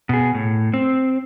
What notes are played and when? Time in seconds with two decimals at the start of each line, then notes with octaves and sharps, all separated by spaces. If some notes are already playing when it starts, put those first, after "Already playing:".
0.09 B2 G#4
0.34 A2
0.74 C4